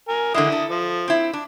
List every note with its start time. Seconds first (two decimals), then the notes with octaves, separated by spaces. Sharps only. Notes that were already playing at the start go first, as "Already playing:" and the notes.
0.08 A#4 G#5
0.34 D3 E3 G#3 E4 D#6
0.52 A4
0.70 F3
1.08 C4 E4
1.33 D4